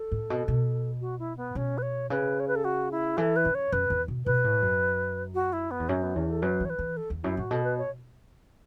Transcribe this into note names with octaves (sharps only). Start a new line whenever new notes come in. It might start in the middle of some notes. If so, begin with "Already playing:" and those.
Already playing: A4
A2
B2
B2
F#4
E4
B3
B2 C#4
B4
C#5
C#3 B4
C#5
B4
A4
F#4
E4
E3 A4
B4
F#2
C#5
F#2 B4
E2
B2
B2 B4
A2
F#2
F#4
E4
B3
E2
F#2 C#4
B3
E2 C#4
A4
F#2 B4
E3 C#5
B4
E3
A4
E2
F#2 E4
A2 F#4
B2 A4
B4
C#5